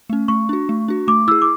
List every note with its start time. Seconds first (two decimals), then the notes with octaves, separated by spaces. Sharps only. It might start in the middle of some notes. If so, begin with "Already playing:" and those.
0.09 A3 C#4
0.28 A3 C#6
0.49 D4 F#4
0.69 A3
0.88 D4 F#4
1.08 A3 D6
1.28 E4 G#4 E6
1.42 D6